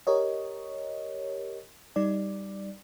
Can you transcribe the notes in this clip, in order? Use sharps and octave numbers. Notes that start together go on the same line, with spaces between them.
G4 A#4 C#5 D#5
G3 D#4 D5